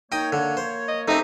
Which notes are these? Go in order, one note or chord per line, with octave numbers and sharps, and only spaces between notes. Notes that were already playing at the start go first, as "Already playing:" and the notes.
A#3 D#4 C#5 G5 D#6
D3
C5
D#5
A3 A#3 C4 C#4 D#4 G4